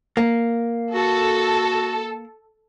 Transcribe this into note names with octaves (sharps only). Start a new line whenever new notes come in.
A#3
F#4 A4